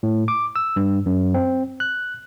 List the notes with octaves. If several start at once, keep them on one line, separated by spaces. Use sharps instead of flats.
A2
D6
E6
G2
F#2
C4
F#6